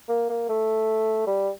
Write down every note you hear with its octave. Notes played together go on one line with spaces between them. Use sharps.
A#3
A#3
A3
G3